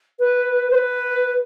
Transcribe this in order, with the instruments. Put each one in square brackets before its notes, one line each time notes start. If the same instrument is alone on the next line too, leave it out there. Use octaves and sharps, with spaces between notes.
[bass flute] B4
C5
B4